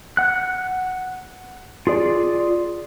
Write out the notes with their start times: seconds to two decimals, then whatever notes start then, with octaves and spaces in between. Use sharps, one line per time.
0.17 F#5 F#6
1.87 F4 G#4 D5